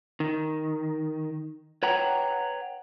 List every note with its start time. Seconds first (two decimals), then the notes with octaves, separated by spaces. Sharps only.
0.20 D#3
1.83 B4 C#5 F#5 G5 A#5